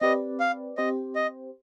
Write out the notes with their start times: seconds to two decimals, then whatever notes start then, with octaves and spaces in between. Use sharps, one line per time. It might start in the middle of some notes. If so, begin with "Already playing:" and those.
0.01 C4 G4 B4 D5 D#5
0.40 F5
0.78 C4 G4 C5 D#5
1.15 D#5